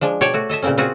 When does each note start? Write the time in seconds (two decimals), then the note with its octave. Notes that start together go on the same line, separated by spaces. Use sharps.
0.01 F3 G#3 D4
0.21 B2 C#5 D5 G5 A5
0.34 A3 F#4
0.49 A4 D#5 E5 A5
0.62 A#2 C#3 A#3 C4 C#4
0.78 C4 F4 F#4 G#4